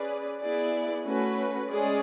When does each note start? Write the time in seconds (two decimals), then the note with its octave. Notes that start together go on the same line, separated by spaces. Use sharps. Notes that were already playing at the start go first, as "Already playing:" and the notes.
Already playing: C#4 G#4 B4 D5
0.39 B3 E4 G#4 D5
1.05 A3 C#4 F#4 B4
1.69 G#3 C#4 G#4 D5